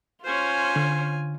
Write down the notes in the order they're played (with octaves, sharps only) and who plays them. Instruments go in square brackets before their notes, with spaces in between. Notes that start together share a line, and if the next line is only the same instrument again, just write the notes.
[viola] C#4 C5 [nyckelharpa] F4 G#5
[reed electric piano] D3